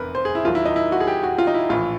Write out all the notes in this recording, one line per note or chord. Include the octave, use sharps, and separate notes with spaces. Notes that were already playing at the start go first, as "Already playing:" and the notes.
Already playing: F1 E2 C3 A#4 B4
C5
G#4
E4
D#2 D#3 F#3 F4
E4
D#4
E4
F#4
G#4
G4
F#4
F4
D#4
E4
A#1 A2 E3 F4